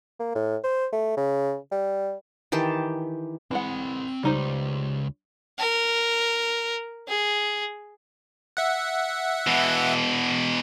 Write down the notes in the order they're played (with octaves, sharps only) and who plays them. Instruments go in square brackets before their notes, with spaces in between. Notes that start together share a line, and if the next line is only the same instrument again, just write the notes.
[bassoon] A#3
A2
C5
A3
C#3
G3
[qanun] D#3 E3 G4 A5
[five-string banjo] E3 G#3 F#5 [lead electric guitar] C4 B5
[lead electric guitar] C#2 [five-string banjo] G3 D#4 C5
[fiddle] A#4
G#4
[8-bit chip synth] E5 F#5
[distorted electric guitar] B2 E3